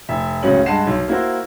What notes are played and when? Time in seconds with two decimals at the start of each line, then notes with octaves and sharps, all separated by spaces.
0.09 F1 E5
0.43 D1 C#2 F#2 F#3 C#4 F#7
0.66 G2 G#3 F#5 A5 C7 E7
0.87 B1
1.08 A#3 E4 F#4 C5